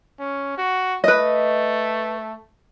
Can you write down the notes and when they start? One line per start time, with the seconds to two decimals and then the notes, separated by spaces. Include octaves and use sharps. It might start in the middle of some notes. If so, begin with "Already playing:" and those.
0.19 C#4
0.58 F#4
1.04 A3 B4 D#5